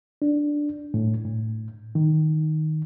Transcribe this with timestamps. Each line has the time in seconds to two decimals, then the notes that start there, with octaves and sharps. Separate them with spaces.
0.22 D4
0.94 A2
1.25 A2
1.95 D#3